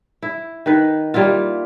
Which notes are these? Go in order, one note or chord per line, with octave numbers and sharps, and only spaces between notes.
E4
D#3 B4
G3 A#3 E4 F4